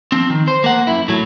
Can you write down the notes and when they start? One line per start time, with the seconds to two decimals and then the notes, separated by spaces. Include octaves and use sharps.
0.12 F3 C4
0.30 D#3
0.48 C5
0.64 A#3 F#5
0.87 F#2 E4
1.08 A2 F#3